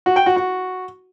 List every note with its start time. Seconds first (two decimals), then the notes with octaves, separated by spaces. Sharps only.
0.06 F#4
0.16 G5
0.26 F#4
0.36 F#4